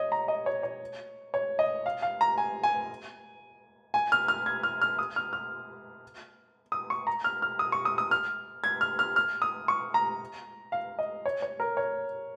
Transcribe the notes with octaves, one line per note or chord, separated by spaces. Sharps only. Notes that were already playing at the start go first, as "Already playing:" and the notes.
Already playing: C#5 D#5
A#5
D#5
C#5
C#5
C#5
D#5
F5
F5
A#5
G#5
G#5
G#5
F6
F6
G#6
F6
F6
D#6
F6
F6
D#6
C#6
A#5
F6
F6
D#6
C#6
D#6
D#6
F6
G#6
F6
F6
F6
D#6
C#6
A#5
F5
D#5
C#5
C#5
A#4
C#5